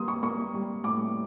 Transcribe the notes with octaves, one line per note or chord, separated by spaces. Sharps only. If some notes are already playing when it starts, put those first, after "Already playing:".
Already playing: G3 A#3 C6 D#6
C#6
A#3 C#6
G3
A2 D6